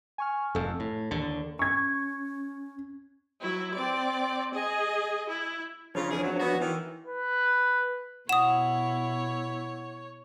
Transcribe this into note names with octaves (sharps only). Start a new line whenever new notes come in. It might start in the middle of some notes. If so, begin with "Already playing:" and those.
G#5 C#6 F6
F1 F2 A4
A2
D#2 D3
C#4 C#6 G#6
F#3 E4
C4 D5
G#4 D#5
E4
C#3 F3 D4 F4 C#5
F2 E3 G#4
F#2 F#3
B3 F#4
D#3 E3
B4
B2 E4 C#5 F#5 D#6 E7